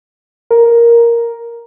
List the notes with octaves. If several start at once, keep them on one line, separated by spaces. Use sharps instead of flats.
A#4